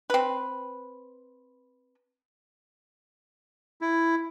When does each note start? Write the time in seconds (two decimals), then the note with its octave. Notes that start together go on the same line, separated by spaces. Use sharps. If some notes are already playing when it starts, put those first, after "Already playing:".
0.10 C4 B4
3.81 E4